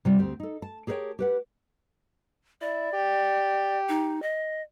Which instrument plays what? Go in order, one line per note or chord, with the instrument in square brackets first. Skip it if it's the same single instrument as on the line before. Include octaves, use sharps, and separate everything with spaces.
[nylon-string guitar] C3 G3 F4
D2 C4 G4
D#4 A4
A5
G4 G#4 A#4 B4 C#5 G5
G4 B4 F#5
[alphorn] E4 [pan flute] D5
[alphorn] G4
[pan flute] D#4
D#5